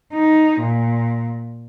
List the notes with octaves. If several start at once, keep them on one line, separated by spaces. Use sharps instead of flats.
D#4
A#2